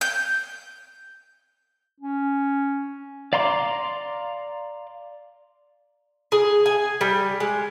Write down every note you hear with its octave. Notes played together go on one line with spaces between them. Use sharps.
G6
C#4
D5 F5 A#5 C6 D6
G#4
G#5
G3
G#3